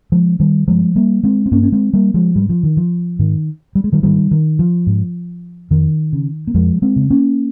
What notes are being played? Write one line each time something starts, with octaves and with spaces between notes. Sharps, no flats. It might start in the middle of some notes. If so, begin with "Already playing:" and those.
F3 G#3
D#3 G3
G2 F3 G#3
G3 A#3
G#3 C4
C4
G2 A#3 C#4
C#4
G#3 C4
G3 A#3
F3 G#3
G#2 G3
F3
D#3
F3
G#2 D#3
G3
G#3
D#3 G3
G#2 D#3 G3
D#3
F3
G#2
F2 D#3
C#3
A#3
F2 F3 G#3
G#3 C4
C#3
A#3 C#4